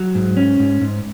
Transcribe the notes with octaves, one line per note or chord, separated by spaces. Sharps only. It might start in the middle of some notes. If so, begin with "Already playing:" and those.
Already playing: F#3
G#2
C#4
G#2
G#2